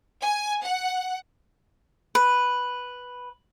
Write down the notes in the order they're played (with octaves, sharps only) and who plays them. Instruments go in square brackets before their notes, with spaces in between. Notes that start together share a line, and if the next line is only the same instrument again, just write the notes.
[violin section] G#5
F#5
[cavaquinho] B4